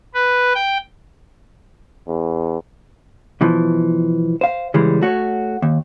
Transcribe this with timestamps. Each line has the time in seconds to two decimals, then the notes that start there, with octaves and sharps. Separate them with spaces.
0.14 B4
0.55 G5
2.08 E2
3.41 B2 E3 F3
4.41 C5 F5
4.74 C#3 E3 G3 G#3
5.01 A3 F#4 C#5
5.62 D#2